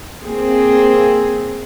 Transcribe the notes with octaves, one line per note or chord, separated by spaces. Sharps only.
A#3 C4 G#4